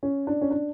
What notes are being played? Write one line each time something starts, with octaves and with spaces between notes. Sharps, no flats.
C#4
D4
C#4
D4